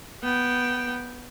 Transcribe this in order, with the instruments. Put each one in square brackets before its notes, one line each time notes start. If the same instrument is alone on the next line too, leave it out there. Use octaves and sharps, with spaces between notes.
[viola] B3 G5